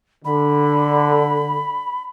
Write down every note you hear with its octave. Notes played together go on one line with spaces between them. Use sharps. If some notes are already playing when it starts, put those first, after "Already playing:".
D3 B5